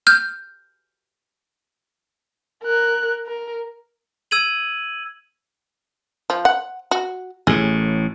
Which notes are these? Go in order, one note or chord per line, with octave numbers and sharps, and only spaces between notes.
F6 G6
A#4 F#6
A#4
E6 G#6 D#7 F#7
F3
F#5
F#4
A1 A2 G#4